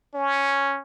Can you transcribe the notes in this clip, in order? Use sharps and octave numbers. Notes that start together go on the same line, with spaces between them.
C#4